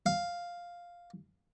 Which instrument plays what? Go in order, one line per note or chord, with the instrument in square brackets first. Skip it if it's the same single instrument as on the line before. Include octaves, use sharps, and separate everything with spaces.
[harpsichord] F5